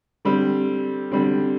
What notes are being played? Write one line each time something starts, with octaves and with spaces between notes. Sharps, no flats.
D3 G3 C4
D3 G3 C4